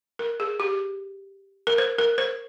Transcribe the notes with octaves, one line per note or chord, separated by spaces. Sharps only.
A#4
G#4
G4
A#4
C5
A#4
C5